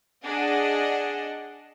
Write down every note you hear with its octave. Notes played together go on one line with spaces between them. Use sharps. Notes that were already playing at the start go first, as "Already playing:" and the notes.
D4 G#4 D#5 F#5